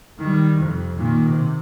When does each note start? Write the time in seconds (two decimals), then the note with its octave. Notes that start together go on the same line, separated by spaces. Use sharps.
0.19 D#3 G3
0.59 F2 C3
0.97 A#2 D#3
1.28 C3